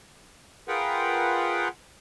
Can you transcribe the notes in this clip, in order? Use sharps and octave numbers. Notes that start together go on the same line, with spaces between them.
F4 G#4 A#4 B4 F#5 G5